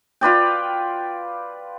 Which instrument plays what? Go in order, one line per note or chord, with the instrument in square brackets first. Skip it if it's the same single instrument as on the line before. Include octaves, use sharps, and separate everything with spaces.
[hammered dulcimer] F4 B4 D5 G5